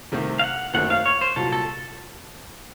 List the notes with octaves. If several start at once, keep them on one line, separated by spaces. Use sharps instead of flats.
C2 C3 D#3 A3 C4
F5
F#5
F#1 F#2 D#3 A3 C4 F#5
F5
C#5
C5
C2 A#2 F#3 A4
A4